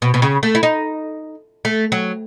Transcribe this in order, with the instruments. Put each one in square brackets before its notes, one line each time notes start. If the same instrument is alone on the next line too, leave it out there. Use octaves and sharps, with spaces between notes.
[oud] B2
B2
C#3
A3
E4
D#4
A3
F#3